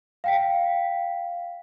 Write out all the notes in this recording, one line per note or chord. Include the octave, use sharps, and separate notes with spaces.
F5 G5 B6